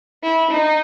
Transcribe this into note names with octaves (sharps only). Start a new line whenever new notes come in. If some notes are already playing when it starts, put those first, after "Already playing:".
E4
D#4